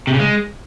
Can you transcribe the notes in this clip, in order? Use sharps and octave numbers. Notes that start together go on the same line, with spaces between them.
C3
C#3
G#3